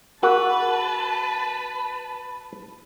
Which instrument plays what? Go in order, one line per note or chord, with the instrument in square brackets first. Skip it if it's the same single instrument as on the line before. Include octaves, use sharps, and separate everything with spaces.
[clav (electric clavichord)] F#4 F#5 [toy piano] G#4 A#4 [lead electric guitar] B4 [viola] A5